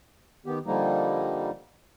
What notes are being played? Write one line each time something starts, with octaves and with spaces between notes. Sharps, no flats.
D#3 B3 G4
D3 F3 G3 A#3 D#4